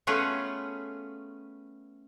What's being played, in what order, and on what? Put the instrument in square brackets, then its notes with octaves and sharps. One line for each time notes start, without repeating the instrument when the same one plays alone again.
[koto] A3 B3 C#4 F4 G#4 B4